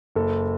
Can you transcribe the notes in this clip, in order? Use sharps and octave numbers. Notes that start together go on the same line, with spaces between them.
F#1 A4